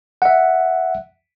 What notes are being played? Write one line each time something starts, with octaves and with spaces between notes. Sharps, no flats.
E5 F#5